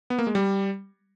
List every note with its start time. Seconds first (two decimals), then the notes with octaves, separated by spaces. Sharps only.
0.10 B3
0.19 A#3
0.27 G#3
0.35 G3